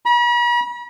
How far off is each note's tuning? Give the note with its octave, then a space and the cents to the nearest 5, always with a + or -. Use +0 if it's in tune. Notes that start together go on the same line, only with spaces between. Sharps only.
B5 -45